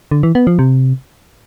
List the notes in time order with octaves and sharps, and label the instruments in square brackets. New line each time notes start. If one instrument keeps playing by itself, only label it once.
[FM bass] D3
E3
B3
F3
C3